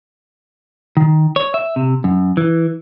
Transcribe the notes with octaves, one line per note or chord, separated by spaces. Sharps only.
D#3
C#5
E5
C3
F#2
E3